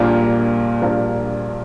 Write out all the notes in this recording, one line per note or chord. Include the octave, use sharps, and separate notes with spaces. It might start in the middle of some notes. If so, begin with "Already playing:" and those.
Already playing: A#1 A#2 G3 A#3 D4
A#1 A#2 G3 A#3 D4